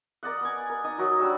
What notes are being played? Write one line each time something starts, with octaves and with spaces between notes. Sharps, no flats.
A#4 D5 D#5 F#5
B3 G#5
A#4
D#4 D#6
F#3 F#4 A#4 D#5
G3 D4 F#5 E6